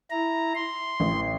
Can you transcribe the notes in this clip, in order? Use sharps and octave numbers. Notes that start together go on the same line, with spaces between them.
E4 A#5
C6
A1